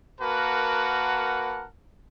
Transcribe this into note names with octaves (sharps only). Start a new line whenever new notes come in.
A#3 F#4 A#4 B4 F#5 A5